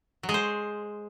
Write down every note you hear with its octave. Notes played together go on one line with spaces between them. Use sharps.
F#3
G#3
C5